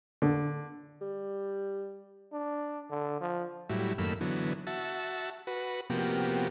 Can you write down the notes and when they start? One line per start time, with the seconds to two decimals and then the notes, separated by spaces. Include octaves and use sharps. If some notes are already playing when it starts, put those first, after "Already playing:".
0.22 D3
1.01 G3
2.33 D4
2.90 D3
3.21 F3
3.69 A2 F#3 G3 E4
3.98 F#2 D#3 A3 A#3 B5 E6
4.21 D3 E3 F#3 B3
4.67 F#4 E5 A5
5.47 F#4 B4
5.90 C3 F3 A#3 B3 F#4 G4